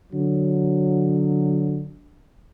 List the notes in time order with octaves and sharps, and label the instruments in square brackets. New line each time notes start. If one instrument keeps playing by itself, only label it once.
[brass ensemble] D3 F#3